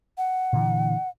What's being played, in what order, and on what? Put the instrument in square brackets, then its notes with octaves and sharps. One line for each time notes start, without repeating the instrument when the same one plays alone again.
[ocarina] F#5
[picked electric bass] A#2 D3 E3